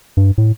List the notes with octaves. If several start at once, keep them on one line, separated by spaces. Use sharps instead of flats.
G2
A2